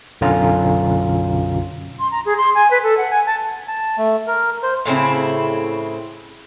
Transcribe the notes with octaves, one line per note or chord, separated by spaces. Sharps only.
B1 F#2 D3 C#4 F4 A#5
C6
A#5
G#4
C6
G#5
B4
A4
F#5
G#5
A5
A5
A3
A#4
C5
A2 C#3 C4 E4